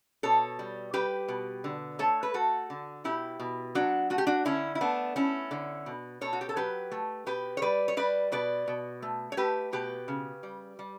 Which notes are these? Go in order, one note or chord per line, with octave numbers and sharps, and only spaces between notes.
B2 A4 C#5
G3
G3 G4 B4
B2
D3
A3 A4 C#5
B4
A3 F#4 A4
D3
B2 E4 G4
B2
F#3 D4 F#4
A3 F#4
G4
D4 F#4
D3 C#4 E4
E4
A3 B3 D4
A3 C#4 E4
D3
B2
B2 A4 C#5
F#4
G4
A4
F#3 G4 B4
A3
B2 G4 B4
C#5
G3 B4 D5
C#5
G3 B4 D5
B2 B4 D5
B2
A3
C#5
A3 G4 B4
B2 G4 B4
C#3
G3
G3